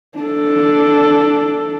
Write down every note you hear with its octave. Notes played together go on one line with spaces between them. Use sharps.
D4 A4